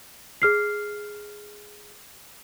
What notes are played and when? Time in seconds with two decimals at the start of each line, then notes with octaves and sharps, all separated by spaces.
0.42 G#4 F6 C7